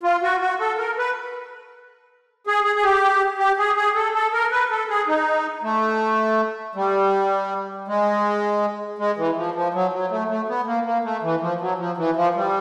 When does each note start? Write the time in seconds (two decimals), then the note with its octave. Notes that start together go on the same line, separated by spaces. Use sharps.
0.03 F4
0.23 F#4
0.41 F#4
0.60 A4
0.78 A#4
0.98 B4
2.47 G#4
2.64 G#4
2.76 G#4
2.83 G4
3.39 G4
3.58 G#4
3.76 G#4
3.95 A4
4.14 A4
4.33 A#4
4.51 B4
4.71 A4
4.89 G#4
5.07 D#4
5.63 A3
6.75 G3
7.88 G#3
8.98 G#3
9.18 E3
9.37 F3
9.55 F3
9.74 F#3
9.93 F#3
10.10 A3
10.29 A3
10.48 B3
10.66 A#3
10.85 A#3
11.04 A3
11.22 E3
11.41 F3
11.61 F#3
11.79 F3
11.98 E3
12.16 F3
12.35 G3